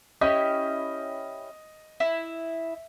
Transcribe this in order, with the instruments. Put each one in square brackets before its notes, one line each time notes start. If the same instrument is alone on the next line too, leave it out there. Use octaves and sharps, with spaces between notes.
[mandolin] C#4 E4 G4 [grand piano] D#5
[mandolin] E4